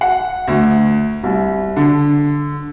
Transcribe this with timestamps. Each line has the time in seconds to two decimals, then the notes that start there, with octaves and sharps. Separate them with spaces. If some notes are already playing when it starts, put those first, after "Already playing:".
0.01 F#5
0.48 D2
1.23 C2
1.76 D3